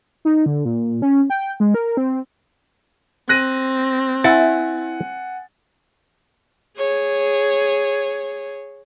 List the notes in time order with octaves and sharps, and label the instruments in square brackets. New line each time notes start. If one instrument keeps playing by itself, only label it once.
[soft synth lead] D#4
D3
A#2
C#4
G5
G#3
A#4
C4
[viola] C4 [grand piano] F#6 A#6 D#7
[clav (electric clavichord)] E4 [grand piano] F#5 G#5 A6
[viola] G#4 C#5